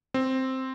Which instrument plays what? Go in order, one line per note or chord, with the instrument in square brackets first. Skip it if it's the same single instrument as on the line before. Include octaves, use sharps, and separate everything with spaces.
[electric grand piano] C4